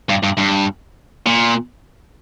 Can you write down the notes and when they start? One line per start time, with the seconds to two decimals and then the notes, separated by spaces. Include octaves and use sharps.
0.09 G2
0.23 G2
0.37 G2
1.27 A#2